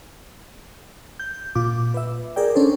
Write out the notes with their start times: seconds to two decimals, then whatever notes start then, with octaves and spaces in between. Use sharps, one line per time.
1.20 G6
1.55 A#2 F4 D6
1.94 B4 E5
2.36 G#4 A#4 D5 G5
2.55 C#4 D4 A4 C5